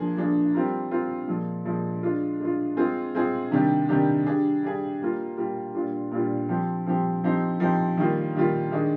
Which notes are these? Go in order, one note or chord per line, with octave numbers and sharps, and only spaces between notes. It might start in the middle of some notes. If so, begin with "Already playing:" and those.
Already playing: F3 A#3 D4 G#4
F3 A#3 D4 G#4
G3 C4 F4 A#4
G3 C4 F4 A#4
A#2 F3 G#3
A#2 F3 G#3
G#3 D4 F4
G#3 D4 F4
G#3 C4 F4 G#4
G#3 C4 F4 G#4
C3 D#3 G3 D4 G4
C3 D#3 G3 D4 G4
G3 D4 G#4
G3 D4 G#4
G3 A#3 F4 A#4
G3 A#3 F4 A#4
A#2 G3 D4 F4
A#2 G3 D4 F4
F3 C4 G4
F3 C4 G4
F3 C4 D#4 G4
F3 C4 D#4 G4
D#3 G3 A#3 F4
D#3 G3 A#3 F4
D#3 G#3 D4 G#4